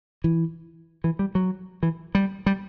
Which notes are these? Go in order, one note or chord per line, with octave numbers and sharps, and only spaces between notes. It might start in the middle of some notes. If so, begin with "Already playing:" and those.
E3
E3
G3
F#3
E3
G3
G3